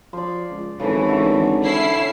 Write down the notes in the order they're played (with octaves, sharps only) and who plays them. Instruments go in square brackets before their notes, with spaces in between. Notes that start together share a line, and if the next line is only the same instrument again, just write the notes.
[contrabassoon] F3 [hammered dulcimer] D5 C6
[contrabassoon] C#2
[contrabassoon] G#1 [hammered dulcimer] C#3 A4 [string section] E3
[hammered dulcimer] D3 A3 A4
[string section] C#4 E4 C7